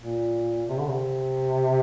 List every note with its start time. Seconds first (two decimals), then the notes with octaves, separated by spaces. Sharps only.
0.02 A#2
0.69 C3
0.79 D3
0.89 C3